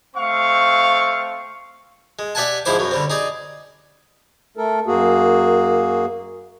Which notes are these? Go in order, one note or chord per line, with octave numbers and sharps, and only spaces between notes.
A3 C4 F5 C#6
G#3
G4 D5 E5 F#5 G#5 A5
G#2 F3 G#3 E4 C5 D6
F#2 F#3
D3 G3 C4
D#4 G#4 D5
A3 A4 A#4
F#2 A#3 F#4 G#4